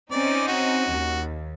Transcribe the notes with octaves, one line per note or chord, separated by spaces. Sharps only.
C4 C#4 D#4 D5
F#4
D#2